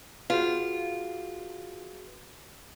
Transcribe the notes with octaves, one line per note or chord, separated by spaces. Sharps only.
F4 F#4 G#4 B4